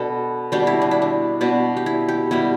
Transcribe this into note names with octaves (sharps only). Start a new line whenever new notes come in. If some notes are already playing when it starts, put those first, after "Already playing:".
Already playing: B2 B3 D4 A4 B4
B2 G3 B3 D4 G4
E4
D4
E4
D4
B2 B3 D4
G4
E4
G4
B2 G3 B3 E4